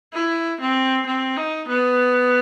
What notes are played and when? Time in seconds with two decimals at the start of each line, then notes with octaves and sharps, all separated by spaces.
0.13 E4
0.61 C4
1.06 C4
1.37 D#4
1.68 B3